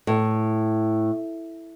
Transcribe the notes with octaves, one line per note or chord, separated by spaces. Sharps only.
A2